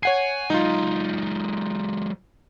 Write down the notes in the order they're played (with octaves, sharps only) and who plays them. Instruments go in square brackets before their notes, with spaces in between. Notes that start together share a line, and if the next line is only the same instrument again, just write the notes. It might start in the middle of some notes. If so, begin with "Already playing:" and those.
[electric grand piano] C#5 F#5 C7 [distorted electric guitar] G#5
[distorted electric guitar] F#3 G#3 [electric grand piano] D#4 F4